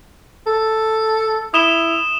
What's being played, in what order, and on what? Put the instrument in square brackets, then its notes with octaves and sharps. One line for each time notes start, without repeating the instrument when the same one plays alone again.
[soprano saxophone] A4
[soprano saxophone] E4 [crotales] D#6 E7 G7